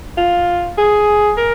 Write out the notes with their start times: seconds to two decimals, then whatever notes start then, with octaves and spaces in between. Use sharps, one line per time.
0.17 F4
0.78 G#4
1.38 A#4